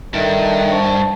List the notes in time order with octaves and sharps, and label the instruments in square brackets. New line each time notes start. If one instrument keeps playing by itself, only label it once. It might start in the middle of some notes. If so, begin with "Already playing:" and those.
[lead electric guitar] G2 [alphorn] D#3 [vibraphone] A4 E5
[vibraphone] C5 A5 C#6